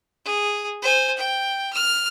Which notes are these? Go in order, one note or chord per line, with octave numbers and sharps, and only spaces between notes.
G#4
C5 G#5
G5
F6